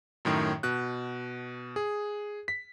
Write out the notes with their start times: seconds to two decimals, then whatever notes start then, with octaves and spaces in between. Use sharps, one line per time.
0.25 F#2 A2 D#3
0.63 B2 F#6
1.76 G#4
2.48 B6